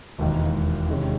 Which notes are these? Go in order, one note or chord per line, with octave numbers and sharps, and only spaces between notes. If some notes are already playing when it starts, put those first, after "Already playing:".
E1 D#2 D#3
C3 D#3 G#3 C#4